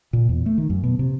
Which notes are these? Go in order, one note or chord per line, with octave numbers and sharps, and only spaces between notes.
A#2
E2
A3
D#3
F#2
B2
C3